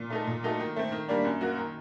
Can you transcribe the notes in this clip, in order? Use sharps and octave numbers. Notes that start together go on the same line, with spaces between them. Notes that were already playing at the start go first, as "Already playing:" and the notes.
Already playing: A#2
A3 D#4 A4
A#2
F#3 A3 D#4 A4
D#3
A3 C4
D#3
G3 A#3 D4
F#2
F#3 A#3 F#4 A#4
D#3